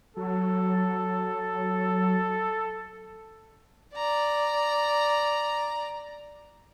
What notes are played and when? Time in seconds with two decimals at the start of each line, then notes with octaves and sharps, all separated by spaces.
0.17 F#3 A4
3.95 D5 A#5